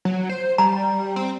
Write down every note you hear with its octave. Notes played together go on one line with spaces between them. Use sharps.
F#3
C5
G3 A#5
C4